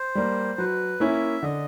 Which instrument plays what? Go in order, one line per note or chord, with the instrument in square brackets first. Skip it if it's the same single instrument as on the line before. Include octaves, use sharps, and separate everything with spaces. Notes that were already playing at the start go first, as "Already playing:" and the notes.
Already playing: [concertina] C5
[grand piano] G3 A#3
[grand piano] F#3 [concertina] B4
[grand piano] A#3 C#4 E4 [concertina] E5
[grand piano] D3 [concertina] D#5